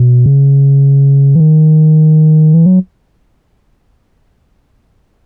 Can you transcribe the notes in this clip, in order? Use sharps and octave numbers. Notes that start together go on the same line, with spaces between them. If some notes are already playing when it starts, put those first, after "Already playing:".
Already playing: B2
C#3
E3
D#3
E3
F#3